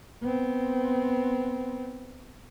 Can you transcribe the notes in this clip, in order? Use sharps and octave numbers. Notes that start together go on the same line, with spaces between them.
B3 C4